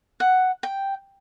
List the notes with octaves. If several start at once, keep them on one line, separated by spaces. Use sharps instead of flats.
F#5
G5